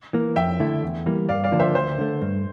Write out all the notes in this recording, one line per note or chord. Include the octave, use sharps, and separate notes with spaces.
E3 A#3
F2 E5 G5
D3 A3 E4
E2
E3 G3 A#3
G2 D5 F5
D5 F5
D3 F3 A#3 D4
C5 E5
D2 C5
D3 A3
G2